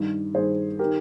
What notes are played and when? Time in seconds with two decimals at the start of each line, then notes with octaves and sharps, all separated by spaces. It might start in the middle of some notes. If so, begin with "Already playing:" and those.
Already playing: G2 D#3
0.34 G2 D#3 G#4 C5
0.79 D#3 G4 A#4